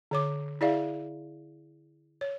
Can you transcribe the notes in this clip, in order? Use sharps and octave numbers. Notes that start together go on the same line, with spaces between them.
D3 C#5 D6
E4 G#4 D5 E5 F5
C#5